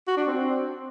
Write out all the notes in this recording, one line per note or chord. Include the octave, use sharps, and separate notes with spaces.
F#4
D4
C4